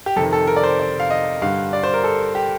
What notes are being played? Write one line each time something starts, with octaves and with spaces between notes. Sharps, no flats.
G4
F2 C3 D#3 A4
A4
A#4
D5
C5
D5
F5
D#5
G2 D3 F5
D5
C5
A#4
A4
G4